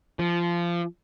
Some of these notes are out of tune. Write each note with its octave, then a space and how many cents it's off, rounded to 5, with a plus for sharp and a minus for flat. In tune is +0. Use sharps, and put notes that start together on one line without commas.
F3 -20